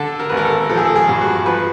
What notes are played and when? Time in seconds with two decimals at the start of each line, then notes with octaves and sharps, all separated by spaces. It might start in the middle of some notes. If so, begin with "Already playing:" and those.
Already playing: D3 A4
0.20 A#4
0.29 G#1 B4
0.37 A#4
0.45 A4
0.70 F3 A4
0.77 G#4
0.85 A4
0.96 G#4
1.09 G2
1.21 F#4
1.46 F3 B4